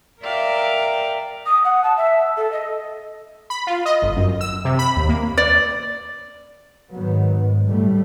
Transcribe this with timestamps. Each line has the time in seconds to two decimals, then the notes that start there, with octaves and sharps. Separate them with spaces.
0.22 A#4 D5 E5 F5 G5 A#5
1.46 D#6
1.65 F#5
1.83 A5
1.97 E5
2.37 A4
2.52 D#5
3.50 B5
3.67 F4
3.86 D#5
4.02 G1
4.16 F#2
4.41 E6
4.65 C3
4.79 B5
4.96 D#2
5.09 A#3
5.37 D5
6.93 G#2 D#3 F#3 B3
7.37 G#2
7.68 D2 A2 G3 A3